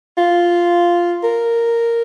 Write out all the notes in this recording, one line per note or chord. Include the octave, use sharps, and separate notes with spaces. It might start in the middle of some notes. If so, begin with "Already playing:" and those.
F4
A#4